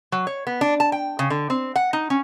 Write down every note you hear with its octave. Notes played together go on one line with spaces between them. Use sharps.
F#3
C#5
B3
D4
A5
G5
C#3
D3
C4
F#5
D#4
C#4